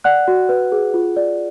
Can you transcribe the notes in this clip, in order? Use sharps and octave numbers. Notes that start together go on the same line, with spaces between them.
D5 F#5 F#6
F#4
B4
G#4
F4
D5